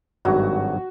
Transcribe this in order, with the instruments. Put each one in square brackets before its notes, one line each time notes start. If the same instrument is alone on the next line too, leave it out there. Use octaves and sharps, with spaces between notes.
[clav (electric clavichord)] G#1 G2 F#3 [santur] F#4